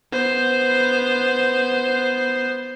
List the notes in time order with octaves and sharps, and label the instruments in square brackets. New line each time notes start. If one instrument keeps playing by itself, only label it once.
[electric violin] B3 C5